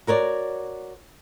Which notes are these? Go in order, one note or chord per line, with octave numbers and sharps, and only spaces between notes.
F#4 A#4 C#5 D5